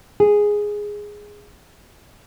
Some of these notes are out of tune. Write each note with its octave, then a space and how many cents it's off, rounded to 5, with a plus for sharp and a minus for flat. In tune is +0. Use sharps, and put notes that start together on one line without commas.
G#4 -5